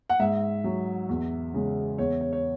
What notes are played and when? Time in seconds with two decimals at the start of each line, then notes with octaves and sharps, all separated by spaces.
0.10 F#5
0.20 G#2 E5
0.64 F#3
1.09 E2
1.54 C#3 G#3
1.98 E2 C#5
2.21 C#5
2.33 C#5